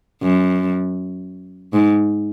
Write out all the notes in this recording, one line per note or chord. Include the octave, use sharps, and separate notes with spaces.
F#2
G#2